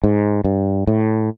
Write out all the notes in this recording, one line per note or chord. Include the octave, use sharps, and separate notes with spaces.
G#2
G2
A2